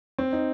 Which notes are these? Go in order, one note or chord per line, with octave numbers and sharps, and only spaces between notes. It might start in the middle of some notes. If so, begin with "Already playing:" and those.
C4
D#4